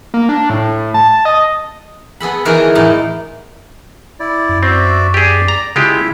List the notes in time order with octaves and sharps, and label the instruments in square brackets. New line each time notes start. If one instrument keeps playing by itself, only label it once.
[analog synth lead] A#3
D4
A2
A5
D#5
[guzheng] B3 G#4 A4 B5
D#3 E3 D#4 G#4 A#4
E2 A2 D#4
[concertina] E4 D5
[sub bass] F#2
[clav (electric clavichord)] C4 [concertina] F#4 D5 E5
[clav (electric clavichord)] G4 G#4 [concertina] D5
[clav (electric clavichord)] A#5
[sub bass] C#3 [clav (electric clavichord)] G#3 F4 G4 [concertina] E4 E5